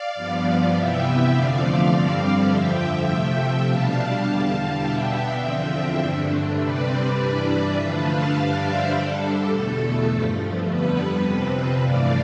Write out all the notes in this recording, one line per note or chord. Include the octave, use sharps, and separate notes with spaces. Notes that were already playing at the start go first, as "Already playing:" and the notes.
Already playing: D5 F5
G2 F3 B3
C3 E3 B3 E5 G5
E5 G5
F2 D3 F3 A3 D5 F5
G2 D3 G3 C4
F2 D3 F3 E5 G5
C3 F3 A3
B2 G3 D4 F5 A5
E2 D3 G3
B2 B3 D4 E5 G5
E2 D3 F3 C4
G2 D3 A3 D4
C3 G3 C4 B4 D5
G2 E3 G3 D4
D3 F3 A3 D4 B4
F5 A5
G2 D3 G3 D4 D5 F5
C5 E5
D3 G3 D4 A4
E2 B2 A3
G2 F3 A3
F2 D3 G3 B3 B4
F2 C3 F3 C4
G2 E3 A3 D4 D5 F5